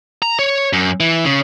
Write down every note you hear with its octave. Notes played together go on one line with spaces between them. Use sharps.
A#5
C#5
F#2
E3
C#3